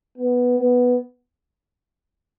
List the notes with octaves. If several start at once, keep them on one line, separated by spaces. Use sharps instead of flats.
B3
B3